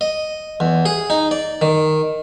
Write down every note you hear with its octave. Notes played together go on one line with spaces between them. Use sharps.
D#5
E2
G#4
D#4
D5
D#3